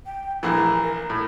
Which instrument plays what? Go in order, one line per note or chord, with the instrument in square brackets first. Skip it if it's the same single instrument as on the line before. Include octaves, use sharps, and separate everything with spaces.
[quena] G5
[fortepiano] A#1 E3 [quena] A#5
[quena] A#4
[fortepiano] A2